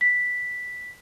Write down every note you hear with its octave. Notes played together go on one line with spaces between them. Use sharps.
B6